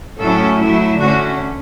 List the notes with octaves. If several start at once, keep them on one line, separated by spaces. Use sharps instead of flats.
A2 F#3 C#4 E4 A4
F#3 A3 E4
D3 A3 C#4 F#4